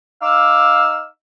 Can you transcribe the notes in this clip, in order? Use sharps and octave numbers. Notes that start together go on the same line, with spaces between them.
D#4 F5 D6 E6